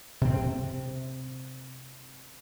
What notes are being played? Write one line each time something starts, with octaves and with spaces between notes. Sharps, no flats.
C3 C4